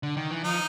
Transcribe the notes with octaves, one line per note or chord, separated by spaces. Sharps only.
D3
D#3
E3
F3 D#4